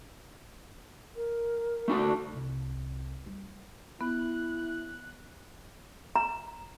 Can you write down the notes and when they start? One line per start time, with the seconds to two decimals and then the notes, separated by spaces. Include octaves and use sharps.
1.16 A#4
1.88 A3 D4 F#4
2.33 C2
3.26 G3
4.01 B3 E4 F#6
6.16 A#5